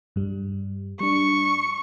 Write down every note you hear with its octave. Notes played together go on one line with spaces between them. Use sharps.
G2 G3
G3 D4 C#6